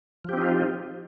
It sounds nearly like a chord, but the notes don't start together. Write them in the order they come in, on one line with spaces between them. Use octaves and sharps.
F3 G4 C4 D#4 F4